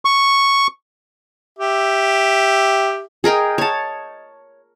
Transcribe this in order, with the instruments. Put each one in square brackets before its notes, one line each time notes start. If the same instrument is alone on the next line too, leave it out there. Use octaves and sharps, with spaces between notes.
[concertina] C#6
[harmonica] G4 E5
[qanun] G#4 A#4 D#5 G5
C#5 A5